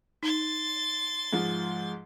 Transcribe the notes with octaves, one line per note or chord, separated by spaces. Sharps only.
D#4 C6 A6
G#2 F3